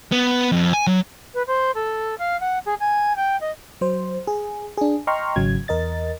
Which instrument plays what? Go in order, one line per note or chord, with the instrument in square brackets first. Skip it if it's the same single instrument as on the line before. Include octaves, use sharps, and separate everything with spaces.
[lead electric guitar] B3
F2
G#5
F#3
[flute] B4
C5
A4
F5
F#5
G#4
G#5
G5
D#5
[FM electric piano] F#3 C5
G#4
D4 G#4
D#5 G5 A#5 C6 C#6 F6
G#1 C#3 F#3 G#6
E2 A#4 D#5 A6